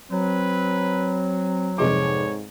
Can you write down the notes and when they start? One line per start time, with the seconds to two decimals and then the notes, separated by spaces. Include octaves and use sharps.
0.11 F#3 C4 B4
1.78 F1 G#2 G#3 C#5 D6